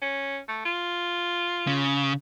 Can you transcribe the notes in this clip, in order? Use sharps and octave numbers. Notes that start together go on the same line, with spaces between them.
C#4
A3
F4
C#3